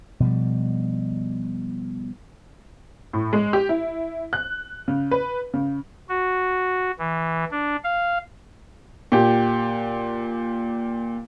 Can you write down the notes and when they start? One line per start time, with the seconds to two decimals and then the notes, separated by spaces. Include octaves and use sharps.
0.20 B2 F3 G3
3.13 A2
3.33 G#3
3.53 G4
3.69 E4
4.33 F#6
4.88 C#3
5.11 B4
5.54 C#3
6.09 F#4
6.99 E3
7.51 D4
7.84 F5
9.12 A#2 G4